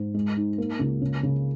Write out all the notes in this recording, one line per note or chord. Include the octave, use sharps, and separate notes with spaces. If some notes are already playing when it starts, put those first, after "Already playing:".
Already playing: G#2
G#3
D#4
A#3
C#2
C#3
C#3